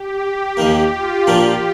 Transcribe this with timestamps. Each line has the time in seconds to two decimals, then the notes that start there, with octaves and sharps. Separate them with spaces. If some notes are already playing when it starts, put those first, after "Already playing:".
Already playing: G4
0.22 G4
0.57 D#2 D#3 A#3
0.92 F4
1.27 A#2 F3 A#3 D4 G4